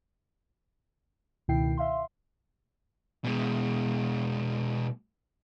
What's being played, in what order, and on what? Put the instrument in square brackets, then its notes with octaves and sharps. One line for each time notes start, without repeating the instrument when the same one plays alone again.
[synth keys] C#2 B2 D#3 E4 G5 C7
E5 F5 C6
[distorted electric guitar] B2 G#3